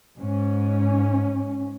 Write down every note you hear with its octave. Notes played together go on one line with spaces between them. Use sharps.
G#2 C#4